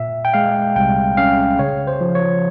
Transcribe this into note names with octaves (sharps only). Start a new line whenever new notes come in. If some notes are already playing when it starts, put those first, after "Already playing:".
Already playing: A#2 E5
G5
G#3 F5
C2 G5
C#4 F5
C#3 C#5
C5
F3
C#5